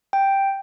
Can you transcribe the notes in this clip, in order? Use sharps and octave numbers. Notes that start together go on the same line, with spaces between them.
G5